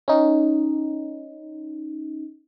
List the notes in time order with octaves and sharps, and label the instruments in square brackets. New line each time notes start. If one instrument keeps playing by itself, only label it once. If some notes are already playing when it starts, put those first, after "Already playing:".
[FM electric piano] C#4 D#4